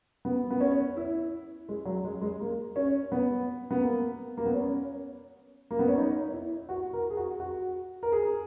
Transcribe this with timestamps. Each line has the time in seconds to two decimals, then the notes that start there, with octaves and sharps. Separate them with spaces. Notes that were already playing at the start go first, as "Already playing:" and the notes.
0.25 B3
0.51 B3
0.61 C#4
0.97 E4
1.69 G#3
1.85 F#3
2.04 G#3
2.21 G#3
2.40 A#3
2.76 C#4
3.12 B3
3.71 B3
3.83 A#3
4.37 A#3
4.46 B3
4.54 C#4
5.71 A#3
5.79 B3
5.88 C#4
5.97 D#4
6.34 E4
6.69 F#4
6.93 A#4
7.10 G#4
7.17 F#4
7.40 F#4
8.03 A#4
8.12 G#4